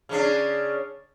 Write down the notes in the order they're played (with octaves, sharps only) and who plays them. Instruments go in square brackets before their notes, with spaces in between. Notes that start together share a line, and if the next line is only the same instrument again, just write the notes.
[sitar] C#3 C#4 D4